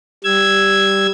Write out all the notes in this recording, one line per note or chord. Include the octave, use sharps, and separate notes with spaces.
G3 E6 G#6